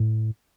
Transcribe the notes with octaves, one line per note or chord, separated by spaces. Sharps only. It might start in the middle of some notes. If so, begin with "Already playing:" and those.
Already playing: A2